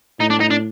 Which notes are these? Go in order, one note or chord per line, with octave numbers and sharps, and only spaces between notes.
A2 D#4
D4
D#4
D4